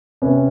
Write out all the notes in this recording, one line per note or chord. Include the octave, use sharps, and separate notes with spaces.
C3 B3 C#4